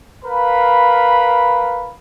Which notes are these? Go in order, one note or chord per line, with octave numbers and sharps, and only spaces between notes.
A#4 B4 F5 B5